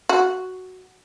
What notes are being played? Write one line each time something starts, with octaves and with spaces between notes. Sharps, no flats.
F#4